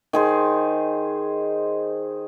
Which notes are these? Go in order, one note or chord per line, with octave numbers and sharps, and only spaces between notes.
D#3 G#4 C5